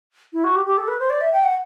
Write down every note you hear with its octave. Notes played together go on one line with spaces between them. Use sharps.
E4
F#4
G4
G4
A4
B4
C5
D5
E5
G5
F#5